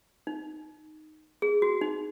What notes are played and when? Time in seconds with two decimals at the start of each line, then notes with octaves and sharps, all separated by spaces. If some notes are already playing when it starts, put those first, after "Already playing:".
0.27 D#4
1.42 G#4
1.62 F#4
1.81 D#4